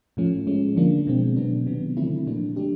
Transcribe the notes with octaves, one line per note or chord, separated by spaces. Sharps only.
A2 F3 A3 C#4
F3 G#3 C#4
D3 F3 A#3 D4
B2 G#3 C4
B2 F#3 B3 D4
C3 D#3 F#3 B3
D3 F3 A3 C4 E4
A#2 F#3 A#3 D4
F#3 A3 D4 G4